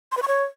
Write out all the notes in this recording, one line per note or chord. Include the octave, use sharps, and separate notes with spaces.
C6
B4
C#6
C#5